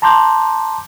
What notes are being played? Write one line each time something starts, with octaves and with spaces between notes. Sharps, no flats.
A5 A#5 C6 D6 G6